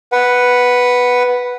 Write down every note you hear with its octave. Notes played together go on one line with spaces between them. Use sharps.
B4 F#5